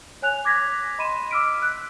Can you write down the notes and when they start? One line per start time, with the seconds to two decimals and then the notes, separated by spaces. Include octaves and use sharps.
0.22 C#5 G#5 F#6 F7
0.45 D6 G#6 A#6 B6
0.98 D#5 B5 C6 D#7 E7
1.31 D6 E6 F6 B6 D7
1.62 F#6